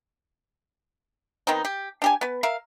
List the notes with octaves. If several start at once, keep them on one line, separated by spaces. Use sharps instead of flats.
D#3 B3 C4 D#4
G4
D4 G4 G#5
B3 B4
A#4 E5 F5